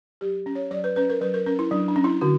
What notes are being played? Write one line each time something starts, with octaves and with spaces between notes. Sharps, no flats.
F#3 G4
C#4
C#5
F#3 D5
B4
C#4 B4
A#4
F#3 B4
A#4
C#4 A#4
E4
F#3 D4
D4
C#4
E4
D3 F#4